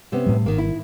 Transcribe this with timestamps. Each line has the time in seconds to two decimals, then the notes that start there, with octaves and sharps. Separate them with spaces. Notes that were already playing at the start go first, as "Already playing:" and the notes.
0.12 C3 B3 C#4
0.26 A2 G3
0.46 G#1 D#3 A#3
0.58 E4